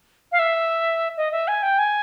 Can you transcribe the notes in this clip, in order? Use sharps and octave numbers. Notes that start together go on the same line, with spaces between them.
F5
E5
D#5
E5
G#5
G5
G#5